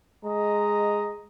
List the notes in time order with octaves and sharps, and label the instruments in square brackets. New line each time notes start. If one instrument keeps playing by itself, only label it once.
[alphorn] G#3 [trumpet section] D#5 A#5